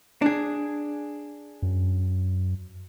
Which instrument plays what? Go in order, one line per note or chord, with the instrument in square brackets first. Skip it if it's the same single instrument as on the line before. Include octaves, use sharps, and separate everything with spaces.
[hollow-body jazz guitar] D4 G#4
[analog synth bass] F#2